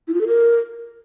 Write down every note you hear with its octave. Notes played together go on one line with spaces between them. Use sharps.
E4
F4
A4
A#4